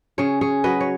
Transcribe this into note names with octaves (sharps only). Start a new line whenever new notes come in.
C#3 G#4 C#5
G#4 C#5
F#3 B4 D#5
C#5